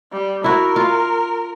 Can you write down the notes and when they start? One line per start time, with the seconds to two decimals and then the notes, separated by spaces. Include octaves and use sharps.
0.13 G3
0.44 E4 F#4 A#4
0.76 F4